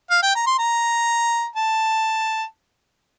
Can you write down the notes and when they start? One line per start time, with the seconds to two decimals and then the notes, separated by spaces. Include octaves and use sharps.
0.10 F5
0.22 G5
0.35 A#5
0.47 C6
0.59 A#5
1.56 A5